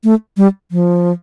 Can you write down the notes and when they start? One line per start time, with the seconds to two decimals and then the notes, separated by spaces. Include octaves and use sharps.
0.04 A3
0.37 G3
0.71 F3